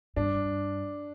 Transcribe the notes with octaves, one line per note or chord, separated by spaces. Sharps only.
G2 D4